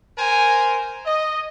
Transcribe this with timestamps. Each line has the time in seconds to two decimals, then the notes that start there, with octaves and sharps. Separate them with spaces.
0.18 A#4 C5 G#5
1.06 D#5